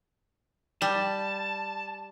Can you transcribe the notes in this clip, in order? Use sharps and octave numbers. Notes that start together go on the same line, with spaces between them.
G3 A5